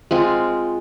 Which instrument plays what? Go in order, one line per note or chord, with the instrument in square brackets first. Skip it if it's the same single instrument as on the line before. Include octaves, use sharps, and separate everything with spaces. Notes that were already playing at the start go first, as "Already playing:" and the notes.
[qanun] G#3 C4 F4